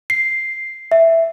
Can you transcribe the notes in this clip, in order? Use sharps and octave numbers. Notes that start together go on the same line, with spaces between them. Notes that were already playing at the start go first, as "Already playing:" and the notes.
C7
E5